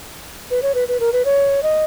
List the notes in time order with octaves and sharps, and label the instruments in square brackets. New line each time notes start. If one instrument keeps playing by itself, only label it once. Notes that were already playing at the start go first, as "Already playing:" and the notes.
[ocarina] B4
C#5
B4
B4
A#4
B4
C#5
D#5